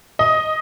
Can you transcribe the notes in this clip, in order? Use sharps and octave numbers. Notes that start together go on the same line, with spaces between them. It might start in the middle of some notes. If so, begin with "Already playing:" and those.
D#5